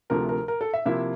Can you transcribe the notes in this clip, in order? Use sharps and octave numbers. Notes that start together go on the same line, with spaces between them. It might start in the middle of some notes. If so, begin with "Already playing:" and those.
D2 C3 F3 A3 A#4
A#4
A#4
A4
E5
C3 F3 A#3 E4 E5